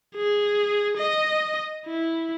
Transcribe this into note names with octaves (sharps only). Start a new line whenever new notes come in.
G#4
D#5
E4